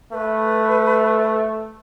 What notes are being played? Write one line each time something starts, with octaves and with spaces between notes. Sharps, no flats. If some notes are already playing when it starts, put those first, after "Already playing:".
A3 B4